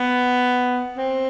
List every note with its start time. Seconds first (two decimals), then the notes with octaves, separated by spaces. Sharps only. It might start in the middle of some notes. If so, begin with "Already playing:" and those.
Already playing: B3
0.98 C4